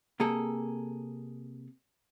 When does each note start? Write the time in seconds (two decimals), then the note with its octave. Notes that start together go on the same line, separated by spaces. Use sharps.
0.20 C3 A#3 G#4 A4